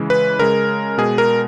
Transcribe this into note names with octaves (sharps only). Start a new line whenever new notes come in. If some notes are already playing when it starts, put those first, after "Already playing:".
Already playing: C#3 E3 G#3
B4
C#3 G#3 A#4
B2 G#3 G#4
A#4